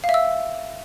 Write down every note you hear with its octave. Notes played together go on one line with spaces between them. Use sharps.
F5
E5
E6